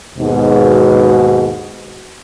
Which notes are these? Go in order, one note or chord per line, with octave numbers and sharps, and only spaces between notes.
D#2 G#2 B2